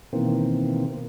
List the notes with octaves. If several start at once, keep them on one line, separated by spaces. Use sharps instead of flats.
B2 D#3 E3 A#3 C4